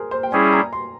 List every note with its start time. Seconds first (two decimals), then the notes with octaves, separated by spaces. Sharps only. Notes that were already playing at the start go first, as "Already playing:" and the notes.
Already playing: G#4 A#4 C5
0.11 C5
0.23 G5
0.32 G3 C#4 E4 G#4 G#5
0.53 A#5
0.73 C6